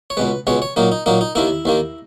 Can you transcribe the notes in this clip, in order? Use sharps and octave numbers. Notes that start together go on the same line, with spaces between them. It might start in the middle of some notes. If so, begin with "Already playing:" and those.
C#5
C#2 B2 G#3 B4
C#2 B2 G#3 C#5
C#5
A#2 F#3 A#3 D#4
D#4
A#2 F#3 A#3 D#4
D#4
D#2 D#3 A#3 E4
D#2 D#3 A#3